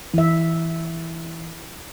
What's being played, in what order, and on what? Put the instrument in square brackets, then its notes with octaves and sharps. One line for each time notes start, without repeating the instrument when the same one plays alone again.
[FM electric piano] E3 [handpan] E4 E5